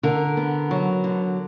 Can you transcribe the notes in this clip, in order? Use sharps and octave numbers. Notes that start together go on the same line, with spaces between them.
D3 A#4
B3
F#3
D3